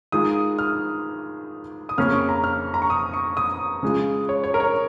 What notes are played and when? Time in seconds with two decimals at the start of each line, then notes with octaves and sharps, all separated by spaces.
0.12 D#3 G#3 F4 D#6
0.59 F6
1.89 D#6
1.97 F2 C#3 A#3 C#4 F6
2.13 C#6
2.29 A#5
2.44 F6
2.74 A#5
2.82 C#6
2.90 D#6
3.13 C#6
3.37 D#6
3.83 C#3 G#3 F4
4.29 C#5
4.44 C#5
4.54 A#4
4.60 C#5